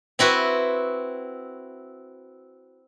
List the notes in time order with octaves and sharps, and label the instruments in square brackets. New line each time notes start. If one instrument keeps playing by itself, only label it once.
[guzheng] C4 E4 F#4 B4